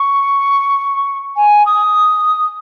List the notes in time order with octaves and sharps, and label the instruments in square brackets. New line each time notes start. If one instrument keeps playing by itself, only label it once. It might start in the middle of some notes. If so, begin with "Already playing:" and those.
Already playing: [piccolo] C#6
G#5
D#6